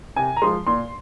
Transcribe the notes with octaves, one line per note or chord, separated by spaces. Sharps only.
C3 G#5
A#5
F3 G#3 C6
A#2 C6